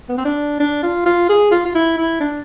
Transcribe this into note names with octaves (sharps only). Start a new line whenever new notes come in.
B3
C4
D4
D4
F4
F4
G#4
F4
F4
E4
E4
D4